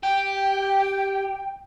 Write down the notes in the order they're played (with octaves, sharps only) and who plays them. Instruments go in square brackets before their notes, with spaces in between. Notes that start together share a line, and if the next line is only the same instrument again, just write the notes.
[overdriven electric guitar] G4 [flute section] G5